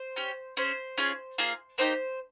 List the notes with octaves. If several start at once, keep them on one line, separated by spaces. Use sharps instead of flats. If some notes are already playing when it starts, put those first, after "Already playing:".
Already playing: C5
C#4 G4
C#4 G#4 C5
C#4 F4 G#4
A#3 F4 G#4
A#3 D#4 G4 C5